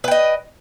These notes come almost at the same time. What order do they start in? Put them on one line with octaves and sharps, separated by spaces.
B4 G5 D#5